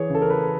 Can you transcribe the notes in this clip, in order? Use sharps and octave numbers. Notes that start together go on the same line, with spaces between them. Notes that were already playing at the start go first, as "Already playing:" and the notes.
Already playing: E3 G#4 C#5
C#3 A4
A#4
B4